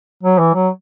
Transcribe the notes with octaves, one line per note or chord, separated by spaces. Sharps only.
F#3
E3
F#3